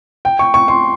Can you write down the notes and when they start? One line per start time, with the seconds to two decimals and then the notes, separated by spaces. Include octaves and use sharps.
0.25 G5
0.39 C#6
0.54 C#6
0.68 C6